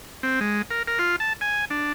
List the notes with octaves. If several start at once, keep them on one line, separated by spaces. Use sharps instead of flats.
C4
G#3
A#4
A#4
F4
A5
G#5
D4